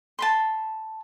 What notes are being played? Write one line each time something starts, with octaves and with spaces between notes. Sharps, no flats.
A5 B5 C6